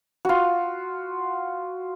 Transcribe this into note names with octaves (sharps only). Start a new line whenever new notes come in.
F4 F#4